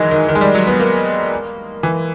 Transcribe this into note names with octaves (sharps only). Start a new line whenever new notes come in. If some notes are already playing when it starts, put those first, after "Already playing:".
Already playing: D#3 E3 F#3 G#3
D#3
D#3
G#3
G3
F#3
B3
A#3
E3